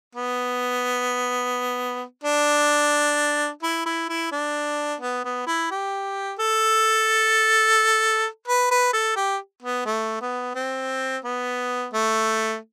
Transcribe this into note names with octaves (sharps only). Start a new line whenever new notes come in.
B3
D4
E4
E4
E4
D4
B3
B3
E4
G4
A4
B4
B4
A4
G4
B3
A3
B3
C4
B3
A3